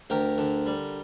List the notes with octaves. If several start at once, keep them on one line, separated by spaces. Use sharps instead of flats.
D2 G4 A#4
D3
G3